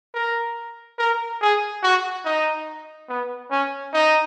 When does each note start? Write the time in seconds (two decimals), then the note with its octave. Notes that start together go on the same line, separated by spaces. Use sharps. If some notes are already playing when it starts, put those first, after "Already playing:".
0.14 A#4
0.98 A#4
1.41 G#4
1.83 F#4
2.25 D#4
3.09 B3
3.51 C#4
3.93 D#4